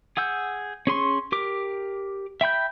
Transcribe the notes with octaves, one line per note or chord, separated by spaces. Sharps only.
G#4 F#5 E6 G6
C#4 G#4 C6 C#6
G4 A#4 D6
E5 G5 B5 G6